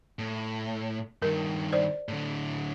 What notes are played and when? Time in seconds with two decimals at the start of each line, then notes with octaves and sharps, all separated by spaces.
0.19 A2
1.22 G2 D#3 A#4
1.73 C5 D5
2.08 A2 D3